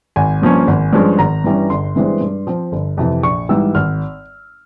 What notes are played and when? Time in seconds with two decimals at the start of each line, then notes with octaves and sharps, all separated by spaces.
0.16 G#1 G#5
0.42 G2 F3 A#3 C#4
0.67 G#1
0.93 G2 F3 G#3 C#4
1.19 G#1 A#5
1.44 G2 E3 G3 C#4
1.70 G1 C6
1.96 G2 E3 G#3 C4
2.21 G2
2.47 F3 C4
2.72 G1
2.97 F2 C3 E3
3.23 A#1 C#6
3.49 G#2 E3 G3 E6
3.75 G#1 F6